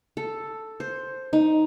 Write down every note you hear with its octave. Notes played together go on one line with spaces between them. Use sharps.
A4
C5
D#4